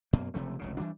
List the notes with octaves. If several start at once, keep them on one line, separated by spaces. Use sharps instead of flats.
F#2 B2 A#3
F#1 C3 F3 A3
F1 C#2 C#3
E3 F#3 G3 D4